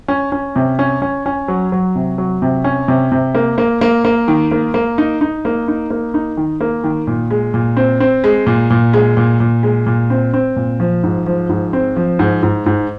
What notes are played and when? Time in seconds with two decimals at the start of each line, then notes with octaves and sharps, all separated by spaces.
0.08 C#4
0.32 C#4
0.56 C3
0.79 C#4
1.02 C#4
1.26 C#4
1.48 F#3
1.72 F#3
1.95 C3
2.18 F#3
2.42 C3
2.64 C#4
2.88 C3
3.12 C3
3.35 A#3
3.58 A#3
3.81 A#3
4.05 A#3
4.28 D#3
4.51 A#3
4.74 A#3
4.98 D#4
5.21 D#4
5.45 A#3
5.68 D#4
5.90 A#3
6.14 D#4
6.37 D#3
6.61 A#3
6.84 D#3
7.07 A#2
7.30 G#3
7.54 A#2
7.77 C4
8.00 C4
8.24 G#3
8.46 A#2
8.70 A#2
8.93 G#3
9.17 A#2
9.40 A#2
9.63 G#3
9.86 A#2
10.10 C4
10.34 C4
10.56 A#2
10.80 F3
11.03 G#2
11.26 F3
11.49 G#2
11.73 C4
11.96 F3
12.19 G#2
12.43 G#2
12.66 G#2